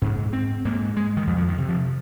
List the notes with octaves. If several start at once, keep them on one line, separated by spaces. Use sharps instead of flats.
G#2 C#4
C4
G#2 A#3
G#3
D#3
F2 F3
F3
D#3
C3
F3